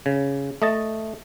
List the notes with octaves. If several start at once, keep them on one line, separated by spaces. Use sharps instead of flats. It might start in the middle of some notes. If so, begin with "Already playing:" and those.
C#3
A3 D#5 A5